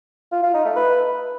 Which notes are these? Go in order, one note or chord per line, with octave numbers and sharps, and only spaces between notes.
F4
F4
D#4
A3
B4